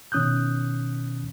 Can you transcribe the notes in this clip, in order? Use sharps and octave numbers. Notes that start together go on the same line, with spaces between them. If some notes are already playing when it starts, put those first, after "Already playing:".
B2 D#3 C#4 D#6 F#6 G6